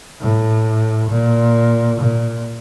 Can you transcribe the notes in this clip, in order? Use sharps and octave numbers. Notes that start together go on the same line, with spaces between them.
A2
A#2
A#2